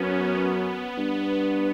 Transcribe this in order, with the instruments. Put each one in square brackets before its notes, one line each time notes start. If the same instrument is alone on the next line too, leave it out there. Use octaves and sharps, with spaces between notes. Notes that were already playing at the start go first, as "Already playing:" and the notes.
Already playing: [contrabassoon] F#2 [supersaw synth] B3 C#4
[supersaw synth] B3
[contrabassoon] G2